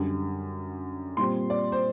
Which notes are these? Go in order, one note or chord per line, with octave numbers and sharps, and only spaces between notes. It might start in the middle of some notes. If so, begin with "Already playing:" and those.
Already playing: F#2 D3 G3 D4
A#2 G3 C4 C6
D5
C5